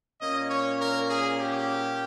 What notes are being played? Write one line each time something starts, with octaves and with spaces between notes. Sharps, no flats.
A#2 A#3 C#4 D#5
C#5
A#4
G#4
G4